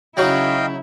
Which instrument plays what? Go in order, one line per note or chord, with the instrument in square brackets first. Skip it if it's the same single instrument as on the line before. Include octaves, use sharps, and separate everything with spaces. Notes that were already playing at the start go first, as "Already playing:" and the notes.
[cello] C#3 E4 [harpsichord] F#3 D#4 F#4 [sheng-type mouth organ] D#5 F5 G5